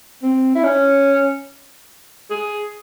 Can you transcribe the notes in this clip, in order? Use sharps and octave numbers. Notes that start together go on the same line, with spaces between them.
C4
E4
C#4
G#4